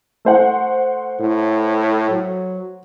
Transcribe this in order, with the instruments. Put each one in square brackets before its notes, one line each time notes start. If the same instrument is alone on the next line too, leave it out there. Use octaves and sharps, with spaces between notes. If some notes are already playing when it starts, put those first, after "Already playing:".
[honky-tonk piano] A3 C5 F#5
[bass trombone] A2
F#3